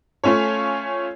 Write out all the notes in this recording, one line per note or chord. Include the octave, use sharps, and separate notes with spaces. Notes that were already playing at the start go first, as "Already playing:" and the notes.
A3 C#4 F4 C#5